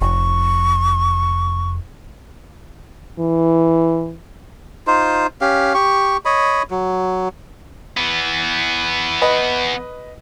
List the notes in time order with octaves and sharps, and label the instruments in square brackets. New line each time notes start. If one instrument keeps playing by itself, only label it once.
[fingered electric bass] F1 [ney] C#6
[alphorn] E3
[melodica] D#4 F4 C5
C#4 G4 F5
G4 C#6
C#5 D#5 B5
F#3
[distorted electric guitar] E3 B3
[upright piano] B4 D#5